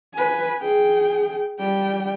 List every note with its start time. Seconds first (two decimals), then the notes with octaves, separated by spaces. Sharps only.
0.15 B4 G#5
0.62 G#4 G5
1.60 G3 G5